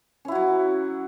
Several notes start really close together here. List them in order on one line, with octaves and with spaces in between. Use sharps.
C#4 E4 F#4 F#3